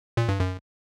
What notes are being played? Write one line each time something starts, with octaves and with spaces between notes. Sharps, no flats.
A#2
G2
F#2